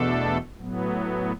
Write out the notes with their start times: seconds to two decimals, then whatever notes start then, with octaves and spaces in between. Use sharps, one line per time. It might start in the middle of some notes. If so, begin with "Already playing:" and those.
Already playing: E2 B2 A3 D4 A4
0.57 A2 F#3 B3